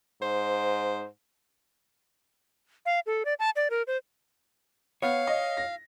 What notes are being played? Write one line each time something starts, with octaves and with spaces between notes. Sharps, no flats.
G#2 C5
F5
A4
D5
A5
D5
A#4
C5
B3 C#5 F5
D#5
A#6